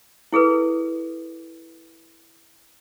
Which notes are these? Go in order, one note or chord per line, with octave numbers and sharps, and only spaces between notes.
E4 G#4 A4 B4